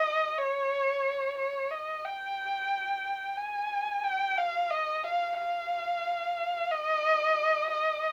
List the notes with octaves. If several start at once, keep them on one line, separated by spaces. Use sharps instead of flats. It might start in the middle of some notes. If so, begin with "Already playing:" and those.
Already playing: D#5
C#5
C#5
D#5
G5
G#5
G5
F5
D#5
F5
F5
D#5
D#5